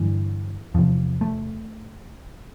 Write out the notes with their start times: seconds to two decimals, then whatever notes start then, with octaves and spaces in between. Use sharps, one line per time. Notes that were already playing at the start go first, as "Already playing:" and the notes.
Already playing: G2 D3 E3
0.74 E2 C3 F3
1.21 A3